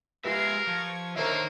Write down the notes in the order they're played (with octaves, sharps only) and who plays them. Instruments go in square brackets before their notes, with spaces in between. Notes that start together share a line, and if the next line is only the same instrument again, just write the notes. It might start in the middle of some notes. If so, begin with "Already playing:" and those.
[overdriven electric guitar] G#3 E5 [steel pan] F4 G4 B4 [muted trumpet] A#4 [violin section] G#6 C7
[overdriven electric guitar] F3 [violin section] C#6 G#6
[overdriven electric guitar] D3 D#3 [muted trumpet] A#3 [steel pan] A#4 C#5 E5 [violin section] C5 C#6